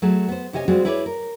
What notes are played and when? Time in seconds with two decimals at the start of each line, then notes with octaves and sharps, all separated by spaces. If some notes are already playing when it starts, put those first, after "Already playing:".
0.02 F#3 A3 F#4 G#4
0.28 B3 C5
0.53 C3 C#4 G4 D#5 E5 G#5
0.68 G3 G#3 C4 F4 F#4
0.85 E4 G#4 B4 C#5 D5
1.06 A#4